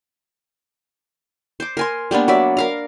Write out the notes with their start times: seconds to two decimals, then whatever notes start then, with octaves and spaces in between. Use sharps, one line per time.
1.60 C5 D6
1.77 A#4 G#5 C6
2.11 G3 A#3 B3 D4
2.28 F#3 D5 E5
2.57 A#4 F5 A#5